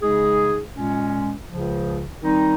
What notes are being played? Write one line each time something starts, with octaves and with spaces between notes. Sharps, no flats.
C#3 G#3 D#4 G#4
A#2 G#3 C#4
C#2 C#3 F3
D#3 G3 C4 D#4